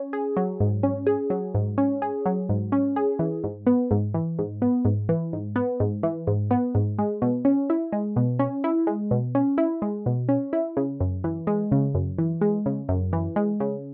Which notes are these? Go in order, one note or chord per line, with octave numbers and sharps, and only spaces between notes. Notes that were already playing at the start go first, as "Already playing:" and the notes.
Already playing: C#4
G#4
F#3
G#2
C#4
G#4
F#3
G#2
C#4
G#4
F#3
G#2
C#4
G#4
E3
G#2
B3
G#2
E3
G#2
B3
G#2
E3
G#2
B3
G#2
E3
G#2
B3
G#2
G#3
B2
C#4
E4
G#3
B2
C#4
E4
G#3
B2
C#4
E4
G#3
B2
C#4
E4
C#3
F#2
E3
G#3
C#3
F#2
E3
G#3
C#3
F#2
E3
G#3
C#3